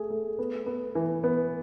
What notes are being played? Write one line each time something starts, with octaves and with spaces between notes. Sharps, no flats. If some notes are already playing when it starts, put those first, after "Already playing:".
Already playing: A3 G#4
A3
B3
B3
E3
B3